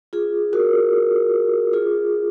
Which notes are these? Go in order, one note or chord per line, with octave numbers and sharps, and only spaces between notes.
F4 G#4
F#4 A#4
F4 G#4